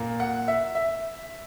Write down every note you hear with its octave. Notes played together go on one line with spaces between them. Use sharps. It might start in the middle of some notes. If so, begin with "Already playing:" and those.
Already playing: A#2 A#3
F#5
E5
E5